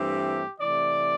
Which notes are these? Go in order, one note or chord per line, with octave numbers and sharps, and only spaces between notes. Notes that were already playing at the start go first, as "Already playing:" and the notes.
Already playing: G2 E3 A3 C4 G4
C3 E3 A3 D5